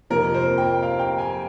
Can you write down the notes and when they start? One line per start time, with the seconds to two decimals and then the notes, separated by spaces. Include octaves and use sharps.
0.10 F2 C3 F3 A#3 A#4
0.34 C5
0.58 G5
0.83 F5
0.99 G5
1.18 G#5